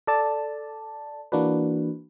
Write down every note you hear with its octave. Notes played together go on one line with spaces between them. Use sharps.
A4 D5 A5
E3 A#3 D4 F#4 B4